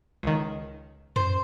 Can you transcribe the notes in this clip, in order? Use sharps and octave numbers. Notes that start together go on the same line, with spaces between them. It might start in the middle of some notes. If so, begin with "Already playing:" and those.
C#2 D#3
F#2 C5